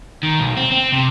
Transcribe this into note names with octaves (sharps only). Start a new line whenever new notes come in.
D#3
B1
C4
C4
C3